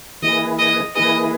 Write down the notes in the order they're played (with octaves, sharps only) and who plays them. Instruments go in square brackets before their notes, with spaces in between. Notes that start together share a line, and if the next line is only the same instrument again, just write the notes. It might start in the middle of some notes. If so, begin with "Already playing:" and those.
[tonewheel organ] E3 A#3 E4 G#4 B4 [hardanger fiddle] D#5
[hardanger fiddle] D#5
[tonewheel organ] E3 A#3 E4 G#4 B4 [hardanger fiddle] D#5